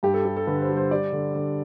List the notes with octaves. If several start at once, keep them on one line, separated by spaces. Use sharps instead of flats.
G2 G4
A4
G3 A4
A4
D3 B4
C5
G3
C5
G3 D5
D3
D3